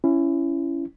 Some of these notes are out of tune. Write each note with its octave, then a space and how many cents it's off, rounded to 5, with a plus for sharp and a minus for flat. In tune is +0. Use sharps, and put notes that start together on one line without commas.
C#4 +0 E4 +20